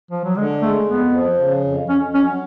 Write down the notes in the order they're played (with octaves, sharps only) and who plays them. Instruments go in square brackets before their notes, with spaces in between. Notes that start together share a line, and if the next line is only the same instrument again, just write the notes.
[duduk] F3
F#3
[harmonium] D3 [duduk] G#3
[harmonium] G#3 [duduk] A3
[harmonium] F2 [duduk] B3
[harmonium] F3
C#3
F2
[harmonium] F2 [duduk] C#4
[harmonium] F#3 [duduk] C#4